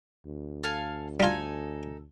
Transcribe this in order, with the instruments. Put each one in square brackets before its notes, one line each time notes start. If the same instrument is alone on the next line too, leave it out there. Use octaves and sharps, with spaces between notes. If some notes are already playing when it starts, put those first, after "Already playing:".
[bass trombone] D2
[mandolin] A4 F5 G#5
[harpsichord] G3 F4 [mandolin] D#4 A4 G#5